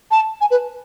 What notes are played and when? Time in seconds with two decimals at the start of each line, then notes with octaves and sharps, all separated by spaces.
0.11 A5
0.41 G#5
0.51 B4